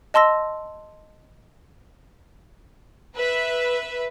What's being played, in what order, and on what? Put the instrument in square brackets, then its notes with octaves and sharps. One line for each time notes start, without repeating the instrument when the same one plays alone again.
[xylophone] D#5 A5 C6 E6 A#6
[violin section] B4 E5